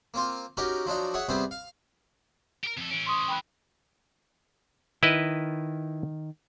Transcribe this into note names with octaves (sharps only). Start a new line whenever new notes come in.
A#3 C4 F4
C#4 D#4 F#4 G4 A#4
F3 F#3 D4 D#4
G#4 C#5 E5 F#5
C3 G3 B3 C4 G#4 C5
F5
G4 A#4
F2 A4
E3 C#4 D7
C6 C#6 D#6
G5 B5 F#6
D#3 E4 B4 D#5